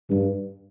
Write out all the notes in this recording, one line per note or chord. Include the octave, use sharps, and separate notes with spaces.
G2